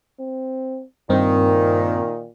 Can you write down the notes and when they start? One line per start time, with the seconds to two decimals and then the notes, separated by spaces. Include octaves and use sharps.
0.20 C4
1.10 G2 A#2 D#3 C4